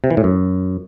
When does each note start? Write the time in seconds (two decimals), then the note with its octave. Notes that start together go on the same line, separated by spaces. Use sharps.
0.04 C3
0.10 E3
0.17 A2
0.24 F#2